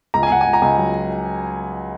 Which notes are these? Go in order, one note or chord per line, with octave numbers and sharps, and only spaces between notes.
C#2 A#5
G#5
C#2 F#5
G#5
C#2
A#5
C#2 G#5
F#3